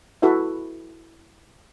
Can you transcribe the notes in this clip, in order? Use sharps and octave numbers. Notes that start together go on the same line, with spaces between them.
E4 F#4 A4 B4 E5